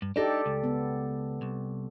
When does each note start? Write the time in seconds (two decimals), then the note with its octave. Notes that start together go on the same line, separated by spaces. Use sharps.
0.02 G2
0.16 D4 D#4 G4 A4 D5
0.46 C#2
0.64 B3
1.42 C2